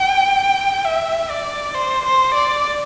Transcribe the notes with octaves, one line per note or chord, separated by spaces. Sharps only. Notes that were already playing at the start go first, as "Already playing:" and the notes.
Already playing: G5
E5
D5
C5
C5
D5